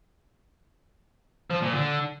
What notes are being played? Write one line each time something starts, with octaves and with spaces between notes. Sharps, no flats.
F3
A#2
D3